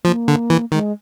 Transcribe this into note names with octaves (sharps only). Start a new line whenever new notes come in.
F3 A#3
D3
E3
D#3 G#3